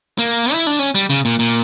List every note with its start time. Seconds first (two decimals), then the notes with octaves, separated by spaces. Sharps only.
0.19 A#3
0.53 E4
0.67 D4
0.79 C#4
0.95 G3
1.10 C#3
1.25 A#2
1.39 A#2